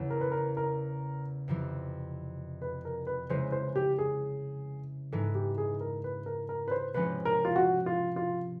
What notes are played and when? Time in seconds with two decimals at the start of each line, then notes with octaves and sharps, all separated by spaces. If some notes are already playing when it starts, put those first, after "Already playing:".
Already playing: E2 C#3 E3
0.10 A#4
0.21 B4
0.31 A#4
0.57 A#4
1.48 F2 C3 E3
2.62 B4
2.85 A#4
3.07 B4
3.29 C#3 E3 G#3 C5
3.52 C5
3.76 G4
3.98 G#4
5.12 G#2 E3 G#3 A4
5.35 G4
5.58 G#4
5.81 A#4
6.04 B4
6.26 A#4
6.49 A#4
6.68 B4
6.71 C5
6.94 C3 F3 G#3 C#4 B4
7.25 A#4
7.45 F4
7.56 F#4
7.86 F4
8.16 F4